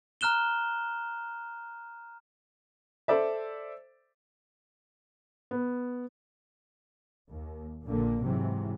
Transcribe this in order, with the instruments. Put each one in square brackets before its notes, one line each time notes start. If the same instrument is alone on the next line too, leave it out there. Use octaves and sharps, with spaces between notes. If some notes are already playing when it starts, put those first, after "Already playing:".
[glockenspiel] A#5 F6 F#6 E7 G7
[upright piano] A4 C5 D5 E5
[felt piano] B3
[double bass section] D#2
A#1 A#2 D3 A#3
G#2 C3 E3 F#3